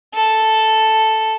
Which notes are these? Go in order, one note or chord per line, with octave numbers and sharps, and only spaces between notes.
A4